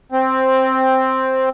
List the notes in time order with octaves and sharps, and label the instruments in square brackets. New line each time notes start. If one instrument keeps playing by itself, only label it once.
[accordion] C4